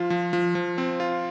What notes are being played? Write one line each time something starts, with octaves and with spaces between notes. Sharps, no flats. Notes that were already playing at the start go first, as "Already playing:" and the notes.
Already playing: F3 F4
F3
F3
F3
C4
F4